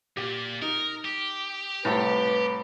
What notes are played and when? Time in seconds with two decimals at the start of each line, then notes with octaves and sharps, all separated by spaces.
0.17 A#2 G4
0.62 D#4 A#4
1.05 G4
1.85 C2 A2 B4